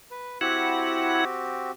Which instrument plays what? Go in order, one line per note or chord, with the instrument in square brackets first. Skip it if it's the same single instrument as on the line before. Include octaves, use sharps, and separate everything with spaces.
[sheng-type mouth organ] B4
[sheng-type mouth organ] C4 F#4 G4 [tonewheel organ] E4 F#5